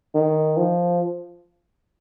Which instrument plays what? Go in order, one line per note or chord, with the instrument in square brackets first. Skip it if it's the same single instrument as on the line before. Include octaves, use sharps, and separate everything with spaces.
[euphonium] D#3
F3